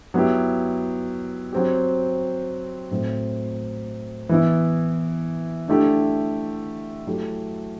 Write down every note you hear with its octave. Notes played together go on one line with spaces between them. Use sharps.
F#3 B3 E4 G4
F#3 C4 G4
A2 F#3 C4
E3 B3 E4
D3 A3 E4 G4
F#3 A3 E4 G4